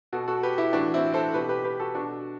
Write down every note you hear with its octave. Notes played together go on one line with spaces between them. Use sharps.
B2 F#4 A4
F#4 A4
G4 B4
E4 G4
A2 E3 D4 F#4
C4 E4
A4 C5
B2 G4 B4
G4 B4
G4 B4
F#4 A4
B2 D4 F#4